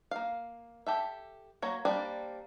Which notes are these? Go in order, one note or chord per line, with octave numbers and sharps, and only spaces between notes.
A#3 F5
G4 A4 E5
F#3 A#3 C#5
G3 A#3 C4 D4